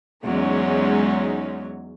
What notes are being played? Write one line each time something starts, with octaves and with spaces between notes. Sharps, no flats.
E2 F#3 G#3 C#4 D#4